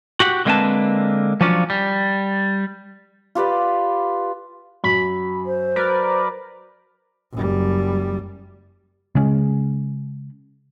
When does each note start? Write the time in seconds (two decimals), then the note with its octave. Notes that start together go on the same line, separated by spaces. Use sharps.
0.20 F#4 G4 F#5
0.45 D3 G#3 A#3 C4 B4 A5
1.41 F3 F#3 C#4 D4 F4
1.70 G3
3.35 F4 G4 B4 D5
4.84 F#2 F#3 B5
5.46 C5
5.76 F#3 A#4 B4 D5
7.33 F#1 G3
9.15 C#3 G#3 C#4